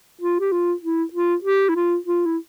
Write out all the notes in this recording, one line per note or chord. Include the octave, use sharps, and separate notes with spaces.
F4
G4
F4
E4
F4
G4
E4
F4
F4
E4